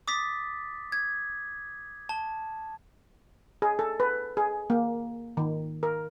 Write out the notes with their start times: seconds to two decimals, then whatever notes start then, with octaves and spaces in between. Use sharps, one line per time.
0.08 D6 D#6 A6 B6
0.92 G#6
2.09 A5
3.62 G#4
3.79 A4
4.00 B4
4.37 G#4
4.70 A#3
5.37 D#3
5.83 A#4